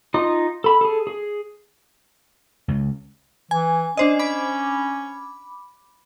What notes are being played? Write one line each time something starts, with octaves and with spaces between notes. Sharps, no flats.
D#4 F4 D#5 D#6
A4 B5
G#4 A4
G#4
C#2
E3 G#5
C#4 D4 C5 D#5
B5 D6